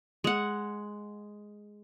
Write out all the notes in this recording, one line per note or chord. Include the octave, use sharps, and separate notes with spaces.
G#3 F#5